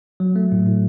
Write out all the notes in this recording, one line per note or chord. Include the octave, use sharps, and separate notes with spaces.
F#3
A3
A2
A2